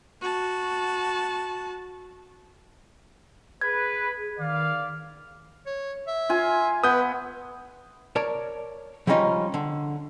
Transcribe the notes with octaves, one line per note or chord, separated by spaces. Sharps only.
F#4 A5
G#4 B4 G#6
D#3 D5 F5
C#5
E5
F4 G#5
B3 B4 D#6 G6
A#4 C#5 D5 A5
F3 G3 G#3 C#4 D#4 F4
D3